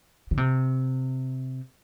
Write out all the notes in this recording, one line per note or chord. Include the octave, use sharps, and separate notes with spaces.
D3
C3